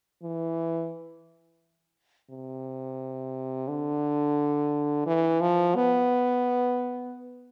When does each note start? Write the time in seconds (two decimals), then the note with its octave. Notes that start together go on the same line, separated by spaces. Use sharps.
0.23 E3
2.30 C3
3.68 D3
5.06 E3
5.41 F3
5.75 B3